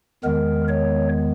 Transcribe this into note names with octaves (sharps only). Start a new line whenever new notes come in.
E2 D#3 G#3 B3 A#4
C#5